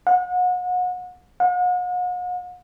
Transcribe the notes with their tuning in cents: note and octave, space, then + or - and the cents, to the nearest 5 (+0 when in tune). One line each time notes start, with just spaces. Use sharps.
F#5 -35
F#5 -40